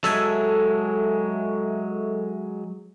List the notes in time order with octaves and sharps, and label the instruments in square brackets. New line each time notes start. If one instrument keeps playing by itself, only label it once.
[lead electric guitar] F#3 G#3 [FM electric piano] A4 E5 G#5